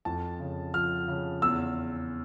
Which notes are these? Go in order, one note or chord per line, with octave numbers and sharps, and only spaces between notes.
F2 A5
C#3
F3 F6
C#3
E2 E6